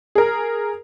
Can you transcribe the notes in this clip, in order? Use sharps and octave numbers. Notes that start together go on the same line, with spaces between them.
G#4 A#4